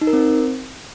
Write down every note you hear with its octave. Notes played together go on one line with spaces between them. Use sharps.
D#4
A#4
C4